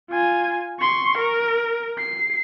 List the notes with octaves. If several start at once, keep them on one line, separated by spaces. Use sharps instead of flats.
F4 G#5
C6 C#6
A#4
C7